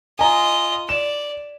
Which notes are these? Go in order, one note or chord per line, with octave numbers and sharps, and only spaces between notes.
F4 D#5 G#5 A#5
D5 E7